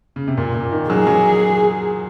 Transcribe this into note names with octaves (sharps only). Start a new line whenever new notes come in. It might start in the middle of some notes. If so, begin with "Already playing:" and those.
C#3
C3
A#2
A#2
D#3
F#3 G#4
F#3